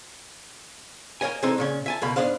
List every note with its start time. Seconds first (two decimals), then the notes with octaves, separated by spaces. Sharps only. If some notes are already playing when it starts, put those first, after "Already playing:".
1.21 A#3 C#5 D#5 G#5
1.43 C3 E3 G#3 C4 D#4 A4
1.58 A#2 C#3 C#4
1.86 E5 G#5 A5
2.02 C#2 B2 A#3 B5
2.16 G#2 B3 D4 C5 F5